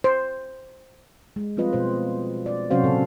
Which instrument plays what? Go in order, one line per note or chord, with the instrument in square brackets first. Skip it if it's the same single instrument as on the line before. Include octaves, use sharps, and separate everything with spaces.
[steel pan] C5
[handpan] G#3
F3 G3 C4 F4 B4 D#5
B2 C5
D5
C3 F#3 C#4 F#4 C5 F5
A#2 C#3 A4